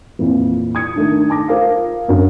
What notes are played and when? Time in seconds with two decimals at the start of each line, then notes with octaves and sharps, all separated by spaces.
0.19 F2 A#2 E3
0.75 D#6 G#6 C#7
0.95 D#3 A3 D4
1.30 A5 D6 A#6
1.48 F4 A#4 C5 F5
2.08 F#2 D3